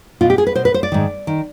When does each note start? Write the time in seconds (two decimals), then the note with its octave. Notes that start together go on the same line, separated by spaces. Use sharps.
0.21 B2 F4
0.30 G4
0.38 G#4
0.47 B4
0.55 B2 C5
0.65 B4
0.74 C5
0.83 D5
0.92 G#2 D#3
1.27 D#3